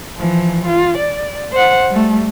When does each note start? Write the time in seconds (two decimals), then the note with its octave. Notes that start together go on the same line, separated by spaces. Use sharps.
0.16 E3 F3
0.66 F4
0.97 D5
1.52 C5 F#5
1.90 G3 A3